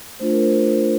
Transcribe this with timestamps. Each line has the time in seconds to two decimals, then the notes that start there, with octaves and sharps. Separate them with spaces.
0.20 A3 D4 F4 C5
0.31 A#4
0.42 C5